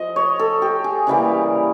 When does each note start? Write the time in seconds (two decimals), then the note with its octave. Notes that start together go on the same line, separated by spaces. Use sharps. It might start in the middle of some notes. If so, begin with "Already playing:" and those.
Already playing: F3 D#5
0.16 C#5
0.39 A4
0.62 G4
0.84 G#4
1.07 C#3 E3 G3 A#3